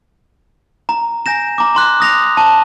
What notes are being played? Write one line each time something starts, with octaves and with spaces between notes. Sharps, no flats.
A#5
G#5 G6 A#6 E7
A#5 D6
A#5 C6 F#6
D#6 A#6 F7
A5